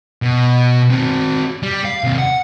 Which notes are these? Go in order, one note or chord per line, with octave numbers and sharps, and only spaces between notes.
B2
C4 F#4
G3
F5
D#2 C3
F#5